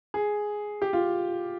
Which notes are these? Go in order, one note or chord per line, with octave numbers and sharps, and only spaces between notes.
G#4
G4
F4